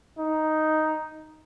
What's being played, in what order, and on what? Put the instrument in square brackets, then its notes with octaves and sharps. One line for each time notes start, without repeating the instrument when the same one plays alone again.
[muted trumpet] D#4